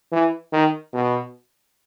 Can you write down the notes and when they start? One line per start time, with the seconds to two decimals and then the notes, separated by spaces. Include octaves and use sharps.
0.12 E3
0.53 D#3
0.93 B2